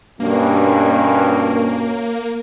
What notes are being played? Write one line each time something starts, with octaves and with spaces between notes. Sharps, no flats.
G2 B2 A#3 C#4